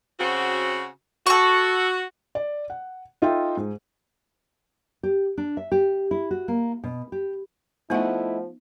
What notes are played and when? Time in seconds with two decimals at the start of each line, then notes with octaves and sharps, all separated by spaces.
0.20 C#3 C4 F#4
1.27 F#4 A4 C#6
2.35 D5
2.70 F#5
3.22 D#4 F4 A4 E5 G5
3.57 G#2
5.03 G4
5.38 D4
5.57 E5
5.72 G4
6.11 E4
6.31 F#4
6.48 A#3
6.84 B2
7.12 G4
7.90 F3 A3 B3 D#4 E4 D#5 E5 F#5